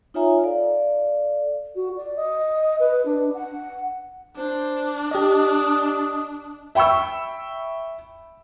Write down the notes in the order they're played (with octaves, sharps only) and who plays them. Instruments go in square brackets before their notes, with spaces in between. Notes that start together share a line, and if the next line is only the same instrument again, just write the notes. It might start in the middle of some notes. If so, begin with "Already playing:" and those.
[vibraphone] D#4 F4 C#5 E5 G#5 A#5
A4 D5 F5
[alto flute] F#4
D5
D#5
B4
D4
F#5
[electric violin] D4 [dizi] C5
[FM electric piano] G4 D#5 [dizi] D#6
[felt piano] E5 G5 B5 C#6 E6